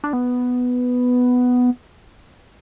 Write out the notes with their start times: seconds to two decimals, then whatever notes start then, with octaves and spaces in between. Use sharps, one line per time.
0.04 D4
0.13 B3